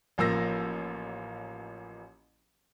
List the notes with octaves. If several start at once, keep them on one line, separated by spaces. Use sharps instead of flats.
A1 F3 A#3 E6 A#6